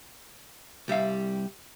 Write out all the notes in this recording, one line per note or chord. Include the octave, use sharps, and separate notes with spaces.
C2 G3 E5 F5